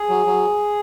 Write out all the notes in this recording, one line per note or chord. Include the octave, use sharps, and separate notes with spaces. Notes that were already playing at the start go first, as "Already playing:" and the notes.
Already playing: G#4
F#3
F#3